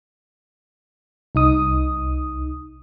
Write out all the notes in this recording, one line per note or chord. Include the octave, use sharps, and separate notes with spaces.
C2 D#4 D#6